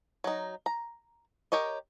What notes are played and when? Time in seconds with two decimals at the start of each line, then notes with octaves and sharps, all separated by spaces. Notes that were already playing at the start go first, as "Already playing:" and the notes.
0.24 F#3 D#4
0.66 A#5
1.52 G4 A#4 C#5 D#5